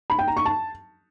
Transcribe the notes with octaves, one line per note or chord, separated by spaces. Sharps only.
B5
G5
A#5
C#6
A5